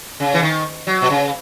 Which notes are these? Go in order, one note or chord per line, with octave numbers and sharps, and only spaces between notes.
C#3
E3
D#3
F#3
B2
C#3